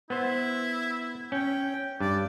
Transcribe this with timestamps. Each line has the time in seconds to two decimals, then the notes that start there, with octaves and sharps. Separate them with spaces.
0.10 B3 E4 C5
1.32 C#4 G5
2.00 G2 D5